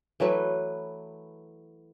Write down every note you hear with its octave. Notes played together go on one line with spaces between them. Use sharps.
E3 F#3 A3 B4